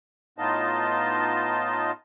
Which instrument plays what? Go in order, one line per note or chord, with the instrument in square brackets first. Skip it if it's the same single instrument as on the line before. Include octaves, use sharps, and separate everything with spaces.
[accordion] A2 B3 D#4 F4 D#5 A5